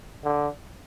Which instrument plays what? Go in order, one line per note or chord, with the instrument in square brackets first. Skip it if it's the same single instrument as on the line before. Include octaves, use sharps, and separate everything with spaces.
[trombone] D3